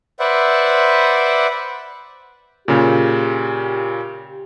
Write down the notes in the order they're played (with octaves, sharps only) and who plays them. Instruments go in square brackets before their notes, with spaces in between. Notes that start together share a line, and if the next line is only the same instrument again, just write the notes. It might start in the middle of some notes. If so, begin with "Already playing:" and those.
[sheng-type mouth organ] B4 C5 D5 E5 F#5
[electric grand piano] A#2 C#3 [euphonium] G4